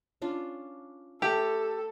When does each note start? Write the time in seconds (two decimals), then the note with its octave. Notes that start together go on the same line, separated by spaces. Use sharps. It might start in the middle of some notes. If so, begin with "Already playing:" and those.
0.22 C#4 D4 F4
1.22 A3 G4 A4 B4